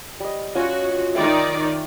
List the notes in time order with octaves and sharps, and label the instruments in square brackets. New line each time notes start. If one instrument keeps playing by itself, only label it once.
[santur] G3 D#5
[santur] C#4 F4 G#5 [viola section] F#4
[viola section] D#3 D#4 D5 [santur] E5 G5